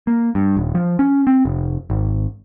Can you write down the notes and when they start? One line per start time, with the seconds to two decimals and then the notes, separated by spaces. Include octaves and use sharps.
0.07 A#3
0.35 G2
0.57 D#1
0.75 F3
0.99 C#4
1.27 C4
1.45 F1
1.90 G#1